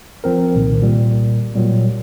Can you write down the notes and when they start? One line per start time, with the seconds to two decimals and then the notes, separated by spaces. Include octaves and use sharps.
0.24 F3 C4 A#4
0.55 C2 A#2 D#3
0.82 A#2 G3
1.55 A#2 F#3 G3